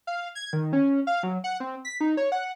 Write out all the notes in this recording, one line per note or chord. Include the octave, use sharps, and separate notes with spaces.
F5
G#6
D#3
C#4
F5
F#3
F#5
C4
B6
D#4
C#5
F#5